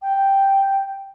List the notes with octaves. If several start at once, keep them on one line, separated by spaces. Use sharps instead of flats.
G5